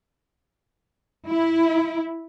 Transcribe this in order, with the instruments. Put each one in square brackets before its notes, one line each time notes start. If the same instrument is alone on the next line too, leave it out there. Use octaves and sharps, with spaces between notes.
[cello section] E4